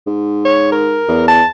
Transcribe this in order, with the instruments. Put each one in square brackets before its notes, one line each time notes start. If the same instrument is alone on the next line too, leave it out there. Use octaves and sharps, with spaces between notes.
[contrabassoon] G#2
[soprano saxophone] C#5
A#4
[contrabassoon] E2
[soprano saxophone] A5